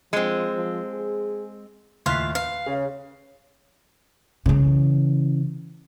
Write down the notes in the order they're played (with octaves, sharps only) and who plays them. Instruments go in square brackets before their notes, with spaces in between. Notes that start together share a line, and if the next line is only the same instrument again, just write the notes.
[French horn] F3 [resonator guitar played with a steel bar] G#3 C4
[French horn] F3
G#4
[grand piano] D#2 A2 E5 [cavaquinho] F4 F5 [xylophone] C6 F#6 B6
[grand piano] B4 [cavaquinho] F5
[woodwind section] C#3 [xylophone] G#4
[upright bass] C#3 E3